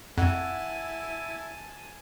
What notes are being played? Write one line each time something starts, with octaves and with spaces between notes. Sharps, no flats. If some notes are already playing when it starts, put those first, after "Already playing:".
F2 E4 F#5 G#5 A5